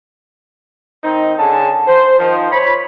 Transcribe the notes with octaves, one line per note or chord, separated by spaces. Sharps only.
D#3 C4 D#4
D3 C#4 G#4 A5
C5
D#3 F3
C5 C#5 B5